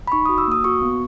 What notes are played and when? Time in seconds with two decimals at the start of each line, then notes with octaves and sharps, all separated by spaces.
0.07 B5
0.12 D#4 C#6
0.26 F#4 D#6
0.38 E6
0.48 A#3 D#6
0.64 F#4 C#6
0.82 B3